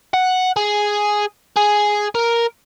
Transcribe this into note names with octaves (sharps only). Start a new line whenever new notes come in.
F#5
G#4
G#4
A#4